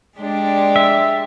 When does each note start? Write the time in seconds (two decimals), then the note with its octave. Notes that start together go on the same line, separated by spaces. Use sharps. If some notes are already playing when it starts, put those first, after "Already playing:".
0.19 G#3 D4 G4 D5
0.76 E5